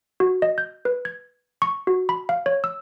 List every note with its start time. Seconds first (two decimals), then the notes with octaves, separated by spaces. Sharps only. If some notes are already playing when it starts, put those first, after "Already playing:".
0.20 F#4
0.42 D#5
0.58 G6
0.85 B4
1.05 G#6
1.62 C#6
1.87 F#4
2.09 B5
2.29 F5
2.46 C#5
2.64 E6